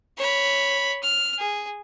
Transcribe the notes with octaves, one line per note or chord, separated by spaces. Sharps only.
C#5 B5
F6
G#4